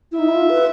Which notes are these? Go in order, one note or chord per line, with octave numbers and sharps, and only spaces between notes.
E4
D#4 E5
E4
F4
B4